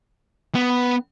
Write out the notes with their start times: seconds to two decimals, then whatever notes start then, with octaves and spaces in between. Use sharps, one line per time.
0.55 B3